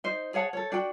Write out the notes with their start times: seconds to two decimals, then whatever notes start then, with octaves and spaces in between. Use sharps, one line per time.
0.04 D#4 C5
0.34 G#4 C#5 F#5 A5
0.53 A4 C#5
0.72 D4 F#4 G5